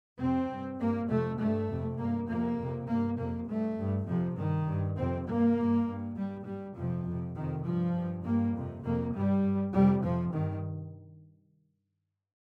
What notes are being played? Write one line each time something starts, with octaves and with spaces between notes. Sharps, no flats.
F2 C3 C4
G2
G2 A#3
F2 C3 A3
G2 A3
F2 C3
G2 A#3
F2 C3 A#3
F2 C3
G2 A#3
F2 C3 A#3
G2 A3
G2
F2 C3 F3
G2 D#3
G2
F2 C3 C4
G2 A#3
G2
G2
G2 G3
G2 G3
F2 C3 F3
F2 C3
F2 C3 D#3
G2 F3
G2
G2 A#3
F2 C3
F2 C3 A#3
G2 G3
G2
F2 C3 G3
F2 C3 F3
G2 D#3